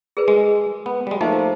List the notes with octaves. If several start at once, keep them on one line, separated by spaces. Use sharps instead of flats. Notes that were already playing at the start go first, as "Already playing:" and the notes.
G#4 A#4 B4
G#3 G#4
B3
G3 G#3
F3 A3 A#3 D#4 C5